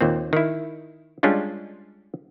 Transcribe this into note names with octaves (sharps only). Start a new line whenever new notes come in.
D#2 A#2 C4
D#3 E4
G3 G#3 C#4 D4 F4